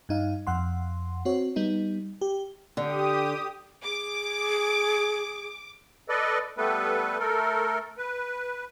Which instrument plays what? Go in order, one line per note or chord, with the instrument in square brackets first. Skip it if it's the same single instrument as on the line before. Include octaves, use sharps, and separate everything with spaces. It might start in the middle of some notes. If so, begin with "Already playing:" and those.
[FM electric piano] G2 D#4 F5
F2 F#5 C6
C4 F#4 C#5
G3 B3 D#4
G4
[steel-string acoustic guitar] D3 [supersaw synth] G4 D#6
[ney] G#4 [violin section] D6
[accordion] A4 B4 D5 D#5
G3 A3 B3 A4 B4
A3 A4 A#4
B4